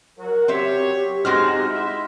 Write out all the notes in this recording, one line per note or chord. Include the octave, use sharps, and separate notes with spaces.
F#3 F#4 A#4
F#3 C4 G4 C#5 E5
G#3 C4 D#4 F#4 F6 A#6
D#4 E4 E5 C6